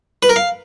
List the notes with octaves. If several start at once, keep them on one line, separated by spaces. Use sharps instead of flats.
B4
A#4
F5